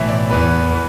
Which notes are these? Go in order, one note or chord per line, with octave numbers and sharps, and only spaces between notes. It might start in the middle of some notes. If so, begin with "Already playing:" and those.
Already playing: B1 A2 E3 E5
D5
E2 E3 B3 B4
E3 B3